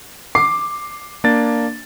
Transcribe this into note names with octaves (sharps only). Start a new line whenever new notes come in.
D6 C7
A#3 D4 A6